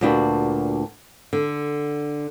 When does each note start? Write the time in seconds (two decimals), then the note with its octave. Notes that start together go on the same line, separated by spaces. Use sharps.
0.01 D2 A#2 B3 D4 F#4 G5
1.33 D3